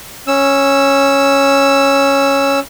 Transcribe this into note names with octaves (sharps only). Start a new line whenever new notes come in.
C#4 E6